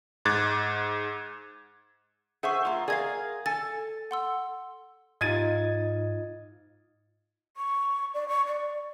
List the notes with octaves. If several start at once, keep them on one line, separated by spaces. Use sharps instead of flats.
G#2 D6 F#6 G#6 A6
G#4 C5 E5 F#5 C#6
A#3 F4
G#4 A#4 D5 F5 G#6
A4 G#5 A5 A6
F#5 C6 E6
G#2 D#4 F4 D#5 G#6 A6 D#7
C#6
D5
C#6
D5